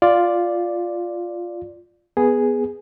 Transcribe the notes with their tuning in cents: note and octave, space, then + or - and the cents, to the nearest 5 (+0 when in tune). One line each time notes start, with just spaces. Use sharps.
F4 +0 D5 +0
B3 +0 G#4 +0